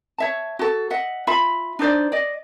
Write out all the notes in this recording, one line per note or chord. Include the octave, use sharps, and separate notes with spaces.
C#5 E5 A5
F#4 A4
D#5 E5 F#5
F4 E5 B5
D4 D#4 C5 D5
D5 D#5